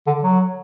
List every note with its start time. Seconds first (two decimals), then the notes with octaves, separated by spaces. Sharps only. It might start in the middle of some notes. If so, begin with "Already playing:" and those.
0.07 D3
0.23 F#3